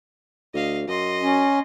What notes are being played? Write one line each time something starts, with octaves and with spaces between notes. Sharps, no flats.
D2 D#5 F5
F#2 D#5 C6
C#4